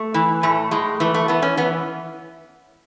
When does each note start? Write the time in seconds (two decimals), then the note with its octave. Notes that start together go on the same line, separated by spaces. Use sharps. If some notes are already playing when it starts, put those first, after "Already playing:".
Already playing: A3
0.14 E3
0.43 A2 A3
0.71 A2 G#3
1.00 E3 A3
1.14 A3
1.28 E3 B3
1.42 C#4
1.57 E3 B3